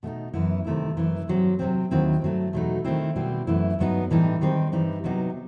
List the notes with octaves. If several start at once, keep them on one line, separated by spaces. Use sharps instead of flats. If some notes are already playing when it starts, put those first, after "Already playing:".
B2 A3 C4 D#4
F#2 E3 B3 E4
C3 D#3 A3 E4
F#2 E3 A3 E4
G2 F#3 C4
C3 D#3 F#3 C4
D#2 D#3 F#3 C4 E4
G2 F#3 A3
E2 B2 F#3 A3 D#4
D#3 A3 C4 E4
B2 G3 C4 E4
F#2 E3 A3 E4
G2 F#3 B3 D#4
A2 E3 G3 D#4
D#3 G3 C4 D#4
G2 E3 G3 D#4
C3 F#3 B3 D#4